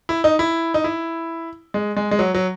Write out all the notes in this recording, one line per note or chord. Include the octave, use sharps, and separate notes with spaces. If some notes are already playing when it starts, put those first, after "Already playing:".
E4
D#4
E4
D#4
E4
G#3
G#3
G#3
F#3
F#3